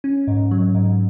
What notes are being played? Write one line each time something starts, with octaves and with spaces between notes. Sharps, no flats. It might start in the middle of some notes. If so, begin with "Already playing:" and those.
C#4
G#2
F#3
G#2